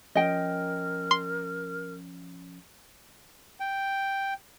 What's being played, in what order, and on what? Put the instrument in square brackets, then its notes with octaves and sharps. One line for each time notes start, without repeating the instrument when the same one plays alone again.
[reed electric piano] F3 C#4 [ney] A#4 [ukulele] D#5 G5
[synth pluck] C6
[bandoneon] G5